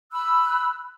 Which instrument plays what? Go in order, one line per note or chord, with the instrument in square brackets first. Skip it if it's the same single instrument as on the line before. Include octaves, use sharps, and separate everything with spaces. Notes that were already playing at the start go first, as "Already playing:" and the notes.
[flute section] B5 E6 F#6